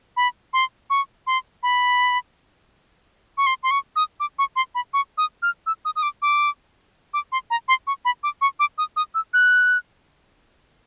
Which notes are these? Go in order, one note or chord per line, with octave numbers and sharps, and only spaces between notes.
B5
C6
C#6
C6
B5
C#6
C6
C6
C#6
D#6
D6
C#6
C6
B5
C#6
D#6
F6
E6
D#6
D#6
D6
D6
D6
C6
A#5
C6
C#6
B5
D6
C#6
D6
D#6
D#6
E6
F#6